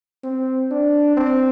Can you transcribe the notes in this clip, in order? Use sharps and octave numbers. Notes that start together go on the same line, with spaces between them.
C4
D4
C4